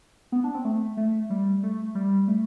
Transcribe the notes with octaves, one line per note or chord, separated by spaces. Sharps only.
B3
D4
C4
A3
A3
G3
A3
G3
A3